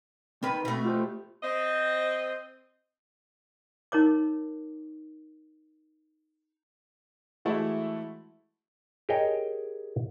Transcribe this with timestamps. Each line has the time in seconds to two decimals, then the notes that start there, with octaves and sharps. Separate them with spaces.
0.43 D#3 C4 B4
0.65 B2 A3
0.85 F4 G4 C5
1.43 C4 D#5
3.92 D#4 A#4 C#5 D6
7.45 E3 G#3 A3 E4 F#4 E5
9.09 G4 G#4 A#4 C#5 D#5 G5